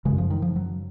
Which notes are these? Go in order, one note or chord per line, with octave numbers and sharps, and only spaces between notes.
F#2 C#3 G#3
F3
D#3
F3
F#3